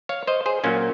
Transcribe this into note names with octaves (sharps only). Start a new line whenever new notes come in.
C#5 F5
C5 D#5
G#4 C5
A#2 F#3 A#3 C#4